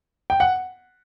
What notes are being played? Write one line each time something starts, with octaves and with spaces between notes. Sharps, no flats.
G5
F#5